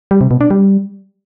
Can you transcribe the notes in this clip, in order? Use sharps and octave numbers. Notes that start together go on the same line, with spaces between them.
G3
C3
B2
D4
G3